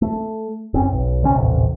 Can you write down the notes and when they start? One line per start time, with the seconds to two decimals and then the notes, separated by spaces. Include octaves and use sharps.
0.02 A3
0.74 F#1 C4 C#4
0.92 B1
1.23 D2 C3 C#4
1.37 D#1 A1 D#2 C3